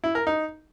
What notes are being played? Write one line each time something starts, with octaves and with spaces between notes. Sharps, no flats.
E4
A#4
D#4